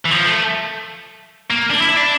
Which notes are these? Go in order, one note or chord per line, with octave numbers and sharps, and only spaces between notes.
E3
F3
A3
A#3
D4
E4
D4